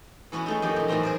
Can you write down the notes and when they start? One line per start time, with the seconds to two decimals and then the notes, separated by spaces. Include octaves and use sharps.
0.32 E3 B3 C#4 E4 F#4
0.46 G#3 A3 D#4
0.62 F2 D#3 D#4 G4
0.76 A#2 E3
0.88 F#2 A2 E3 C4 A#5
1.03 G#4 A#4 C5